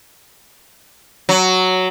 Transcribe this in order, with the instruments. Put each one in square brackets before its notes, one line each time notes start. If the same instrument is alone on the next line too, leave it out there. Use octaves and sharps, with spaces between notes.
[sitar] F#3